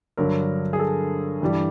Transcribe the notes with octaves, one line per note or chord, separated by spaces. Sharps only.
G2 D3 F#3 A#4
G#4
A4
G2 E3 G3